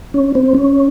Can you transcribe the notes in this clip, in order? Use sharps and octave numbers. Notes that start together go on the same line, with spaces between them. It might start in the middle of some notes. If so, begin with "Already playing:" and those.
C#4
C4
C#4